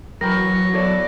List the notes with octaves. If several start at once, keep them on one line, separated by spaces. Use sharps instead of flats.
E3 F#3 A#4 G5 B5 C#6 A#6
B3 E4 A4 C#5 D5